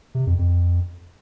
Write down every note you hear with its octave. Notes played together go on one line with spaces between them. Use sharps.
C3
F2
F2